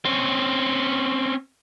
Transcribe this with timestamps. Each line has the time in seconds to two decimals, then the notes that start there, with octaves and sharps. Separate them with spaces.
0.05 C4 C#4